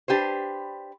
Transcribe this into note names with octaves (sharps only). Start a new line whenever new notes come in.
D4 G4 B4 C5